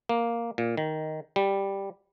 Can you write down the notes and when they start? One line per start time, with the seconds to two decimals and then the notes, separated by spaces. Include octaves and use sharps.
0.09 A#3
0.58 A#2
0.77 D#3
1.36 G3